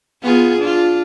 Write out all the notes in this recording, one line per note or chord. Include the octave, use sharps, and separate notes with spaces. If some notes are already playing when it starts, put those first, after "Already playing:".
B3 F4 G#4
D4 F4